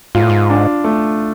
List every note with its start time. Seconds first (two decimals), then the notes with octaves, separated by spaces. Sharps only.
0.15 G#2 F4
0.22 A2
0.30 G#2
0.50 D4
0.84 A3